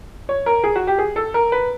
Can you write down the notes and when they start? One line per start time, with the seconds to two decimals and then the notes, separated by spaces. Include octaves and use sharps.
0.29 C#5
0.46 A#4
0.64 G#4
0.76 F#4
0.87 G4
0.98 G#4
1.16 A4
1.34 A#4
1.52 B4